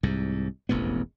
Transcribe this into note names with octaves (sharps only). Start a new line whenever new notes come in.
C2 G#2
E1 A1 F2 B3